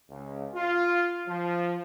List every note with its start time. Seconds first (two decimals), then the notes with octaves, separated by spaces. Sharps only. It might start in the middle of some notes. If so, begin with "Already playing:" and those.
0.10 C#2
0.55 F4
1.28 F3